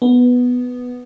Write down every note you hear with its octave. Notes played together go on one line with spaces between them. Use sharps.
B3